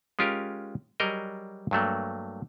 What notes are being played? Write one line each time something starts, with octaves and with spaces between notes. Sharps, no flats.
G#3 C#4 F4 G4 A#4
F#3 G3 F#4 G#4 A#4 D#5
G2 F#3 A3 A#3